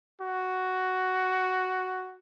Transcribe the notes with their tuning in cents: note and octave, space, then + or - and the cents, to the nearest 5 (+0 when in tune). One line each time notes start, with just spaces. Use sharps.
F#4 +5